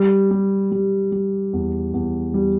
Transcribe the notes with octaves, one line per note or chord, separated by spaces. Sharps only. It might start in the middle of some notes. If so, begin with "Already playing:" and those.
Already playing: G3
G3
G3
G3
E2
E2
G3